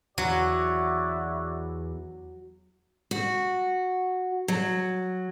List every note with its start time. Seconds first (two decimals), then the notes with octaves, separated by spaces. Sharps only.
0.18 E2 F#3 E4 F#4 D5
3.11 F#4
4.48 F#3